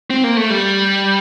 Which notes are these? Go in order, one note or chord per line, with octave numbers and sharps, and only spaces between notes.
C4
A#3
A3
G3